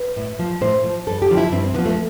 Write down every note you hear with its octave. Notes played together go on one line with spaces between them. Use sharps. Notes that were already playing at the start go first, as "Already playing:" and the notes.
Already playing: B4
A2
F3
A2 C5
F3
G2 A4
G4
D3 F3
E4
G2 C4
C4
D3 B3
F3
A3